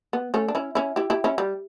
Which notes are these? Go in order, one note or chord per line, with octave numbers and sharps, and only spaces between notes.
B3
A3 C#4
D4
C#4 E4
C#4 E4
E4 G4
E4 G4
C#4 E4
G3